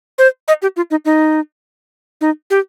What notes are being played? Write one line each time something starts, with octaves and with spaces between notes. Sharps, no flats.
C5
D#5
G4
F4
D#4
D#4
D#4
G4